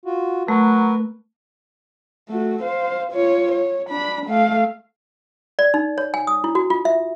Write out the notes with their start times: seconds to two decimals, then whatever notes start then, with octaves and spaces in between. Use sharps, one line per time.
0.05 F4 F#4
0.48 F#3 A3 A#4 B4
2.29 A3 F#4
2.63 C5 F5
3.12 F4 C#5
3.52 C#5
3.89 D4 B5
4.26 A3 F5
5.59 D5
5.74 D#4
5.98 C#5
6.14 G#5
6.27 D#6
6.44 E4
6.55 F#4
6.70 F4
6.85 E5